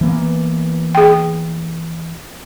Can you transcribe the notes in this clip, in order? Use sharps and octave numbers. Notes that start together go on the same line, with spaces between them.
E3 A#3 B3
G#4 G5